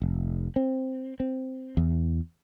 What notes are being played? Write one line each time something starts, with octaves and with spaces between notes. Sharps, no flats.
F1
C4
C4
E2